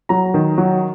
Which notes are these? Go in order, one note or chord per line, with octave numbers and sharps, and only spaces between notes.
F#3 A#5
D#3
F#3